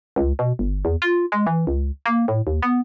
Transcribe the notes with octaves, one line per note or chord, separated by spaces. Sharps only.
C#2
B2
G1
E2
F4
G#3
E3
C#2
A#3
A2
D#2
B3